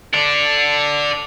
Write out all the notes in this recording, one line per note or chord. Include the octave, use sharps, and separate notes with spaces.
A4 D5